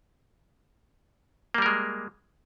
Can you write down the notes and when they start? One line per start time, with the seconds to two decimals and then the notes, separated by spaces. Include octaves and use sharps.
1.54 A#3
1.58 G3
1.62 A#4
1.66 G#3